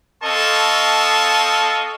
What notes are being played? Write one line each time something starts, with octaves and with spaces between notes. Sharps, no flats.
C4 A4 D#5 F5 A5 C#6